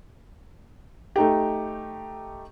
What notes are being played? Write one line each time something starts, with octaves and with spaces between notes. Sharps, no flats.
A3 D#4 G4